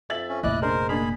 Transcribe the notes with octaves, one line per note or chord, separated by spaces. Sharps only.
F2 E5 A6 F#7
C#4
F1 A#1 E4 D5 D#5 F#6
G#3 D4 A#4 C5
A#3 D4 G#4 B5